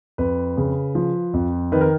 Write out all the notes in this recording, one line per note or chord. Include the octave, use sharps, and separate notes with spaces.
F2 B4
C#3
F3
F2
D#3 B4
A#4